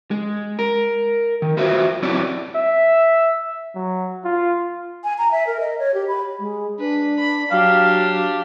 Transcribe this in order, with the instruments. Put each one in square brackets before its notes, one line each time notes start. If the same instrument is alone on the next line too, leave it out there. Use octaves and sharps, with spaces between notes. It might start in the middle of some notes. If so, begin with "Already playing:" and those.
[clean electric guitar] G#3
A#4
D#3
F4 F#4 B4 C5 E5
F#3 C4 E4 B4 C#5 D5
[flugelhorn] E5
F#3
F4
[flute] G#5
A#5
E5
A#4
D#5
C#5
G4
B5
[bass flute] G#3
[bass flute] D4 [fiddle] B4
[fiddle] B5
[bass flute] F#3 [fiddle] D4 G4 [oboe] F5